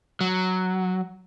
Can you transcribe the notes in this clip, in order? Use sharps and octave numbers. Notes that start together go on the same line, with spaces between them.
F#3